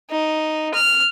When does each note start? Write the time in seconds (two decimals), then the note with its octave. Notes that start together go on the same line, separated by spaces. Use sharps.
0.10 D#4
0.74 F6